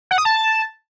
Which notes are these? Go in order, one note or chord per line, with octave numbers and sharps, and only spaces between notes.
F#5
D#6
A5